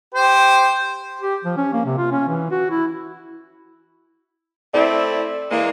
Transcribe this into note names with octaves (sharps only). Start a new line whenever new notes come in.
G4 C5
G4
F3
C#4
A#3
C3
F4
C#4
E3
F#4
E4
A3 C4 E4 D5
E3 G#3 A#3